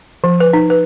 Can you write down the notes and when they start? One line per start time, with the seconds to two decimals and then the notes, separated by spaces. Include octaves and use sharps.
0.24 F3
0.40 B4
0.53 D#4
0.70 B4